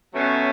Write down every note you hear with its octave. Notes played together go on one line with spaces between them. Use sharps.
B2 F#3 A3 C#4